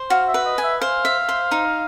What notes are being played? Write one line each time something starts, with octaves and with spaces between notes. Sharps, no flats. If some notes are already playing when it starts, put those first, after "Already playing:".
Already playing: C5
F#4 F5
E5
B4
D#5
G#5
E5
C5 F5
E5
C5
D#4